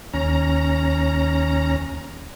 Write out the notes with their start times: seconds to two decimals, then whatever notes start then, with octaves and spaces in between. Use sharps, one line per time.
0.14 D#2 C#4 A#5